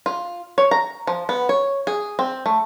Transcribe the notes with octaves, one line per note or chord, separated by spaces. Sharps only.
F4
C#5
A#5
F3
B3
C#5
G#4
C4
A3